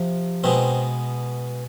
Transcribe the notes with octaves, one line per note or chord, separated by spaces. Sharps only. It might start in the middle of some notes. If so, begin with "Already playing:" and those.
Already playing: C3 F3
B2 G#3 B3 C4